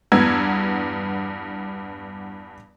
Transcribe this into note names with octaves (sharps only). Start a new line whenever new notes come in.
E2 G2 B3 A#5 E6 G#6